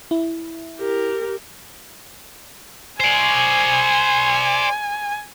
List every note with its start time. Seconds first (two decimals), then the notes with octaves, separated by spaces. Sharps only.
0.11 E4
0.79 G4 A#4
3.00 C5 D5 G#5